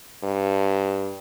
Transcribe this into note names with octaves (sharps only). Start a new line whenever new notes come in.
G2